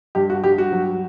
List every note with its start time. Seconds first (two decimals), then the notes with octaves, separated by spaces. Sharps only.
0.15 G2 G4
0.30 F#4
0.44 G2 G4
0.58 F#4
0.72 F#3